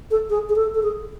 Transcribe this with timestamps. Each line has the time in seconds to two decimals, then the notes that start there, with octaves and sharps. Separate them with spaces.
0.10 A4
0.29 G#4
0.49 G#4
0.55 A4
0.74 A4
0.82 G#4